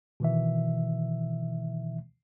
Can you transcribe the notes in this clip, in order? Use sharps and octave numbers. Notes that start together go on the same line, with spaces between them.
B2 D#3 E3 E5